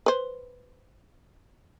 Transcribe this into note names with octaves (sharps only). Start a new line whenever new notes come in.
B4 C5